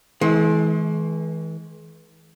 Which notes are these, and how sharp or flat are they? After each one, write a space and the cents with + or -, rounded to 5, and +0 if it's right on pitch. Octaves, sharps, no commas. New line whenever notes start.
E3 -30 G#3 +35